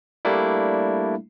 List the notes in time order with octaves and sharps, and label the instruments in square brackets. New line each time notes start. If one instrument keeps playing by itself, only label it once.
[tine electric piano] G3 A3 A#3 D4 E4